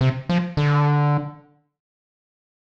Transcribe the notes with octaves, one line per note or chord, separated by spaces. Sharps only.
C3
F3
D3